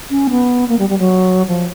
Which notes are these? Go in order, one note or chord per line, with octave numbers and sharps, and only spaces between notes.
C#4
B3
A#3
G3
G3
F#3
F3